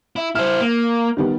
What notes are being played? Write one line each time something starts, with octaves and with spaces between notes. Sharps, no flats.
E4
E4 C5 F6
A#3
D#3 G3 B3